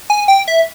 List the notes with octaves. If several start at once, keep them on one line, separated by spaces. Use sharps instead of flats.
G#5
G5
E5